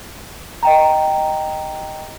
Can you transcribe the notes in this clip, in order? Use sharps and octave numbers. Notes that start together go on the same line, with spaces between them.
D#5 G5 A#5